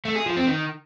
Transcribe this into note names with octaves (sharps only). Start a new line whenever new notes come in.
A3
G#4
F3
C4
D#3